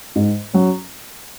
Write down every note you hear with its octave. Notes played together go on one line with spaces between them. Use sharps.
G#2
F#3 C#4